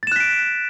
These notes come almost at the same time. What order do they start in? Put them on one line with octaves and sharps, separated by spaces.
A6 E7 F#6 B6 D7